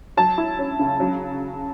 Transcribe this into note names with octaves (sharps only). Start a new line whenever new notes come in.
F#3 A5
E4
C#4
C#3
F#3